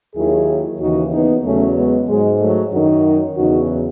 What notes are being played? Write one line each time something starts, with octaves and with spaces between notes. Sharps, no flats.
D#2 D#3 F#3 E4 G#4
D#2 C#3 E3 D#4 F#4
B3 D#4
E2 C#3 F#3 A3 C#4
G#3 B3
G#2 F#3 G#3
F#3 A3
F#2 D#3 F#3 D#4 F#4
E2 C#3 F#3 D#4 F#4